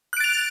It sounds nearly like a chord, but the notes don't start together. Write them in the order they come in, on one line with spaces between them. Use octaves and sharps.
F#6 D7 A6 F7